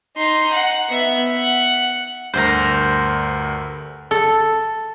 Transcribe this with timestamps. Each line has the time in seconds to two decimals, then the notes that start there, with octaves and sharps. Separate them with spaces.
0.17 D#4 C6
0.53 F#5
0.89 B3 E5
1.34 F#5
2.34 D2 G2 A#4 C5
4.11 A4